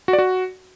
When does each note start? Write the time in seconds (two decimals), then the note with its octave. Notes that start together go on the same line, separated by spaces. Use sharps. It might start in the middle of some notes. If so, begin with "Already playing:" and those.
0.08 F#4
0.13 D5
0.18 F#4